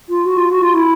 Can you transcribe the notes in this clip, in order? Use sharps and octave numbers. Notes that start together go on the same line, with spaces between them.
F4
F#4
F4
F#4
F4
E4